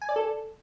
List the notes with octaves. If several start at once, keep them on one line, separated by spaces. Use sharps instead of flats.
G#5
D5
A4